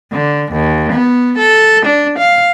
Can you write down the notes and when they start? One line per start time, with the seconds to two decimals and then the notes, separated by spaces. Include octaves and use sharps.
0.12 D3
0.52 D#2
0.93 B3
1.38 A4
1.86 D4
2.19 F5